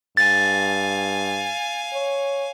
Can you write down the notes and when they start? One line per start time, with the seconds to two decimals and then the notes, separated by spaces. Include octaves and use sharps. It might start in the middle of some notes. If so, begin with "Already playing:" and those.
0.17 G2 F5 G#5 A6
1.93 C#5